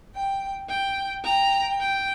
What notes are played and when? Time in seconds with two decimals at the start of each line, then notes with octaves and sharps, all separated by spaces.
0.15 G5
0.69 G5
1.24 G5 A#5
1.79 G5